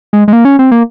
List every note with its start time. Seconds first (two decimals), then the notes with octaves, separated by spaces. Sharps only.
0.13 G#3
0.28 G#3
0.33 A#3
0.45 C#4
0.59 C4
0.71 A#3